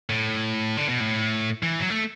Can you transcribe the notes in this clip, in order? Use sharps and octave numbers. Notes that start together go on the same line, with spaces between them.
A2
D3
B2
A2
E3
F#3
A3